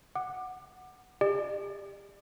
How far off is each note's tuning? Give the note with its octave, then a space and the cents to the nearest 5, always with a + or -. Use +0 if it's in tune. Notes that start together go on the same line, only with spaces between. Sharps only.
F#5 +0 D6 +25
G4 +30 D5 +35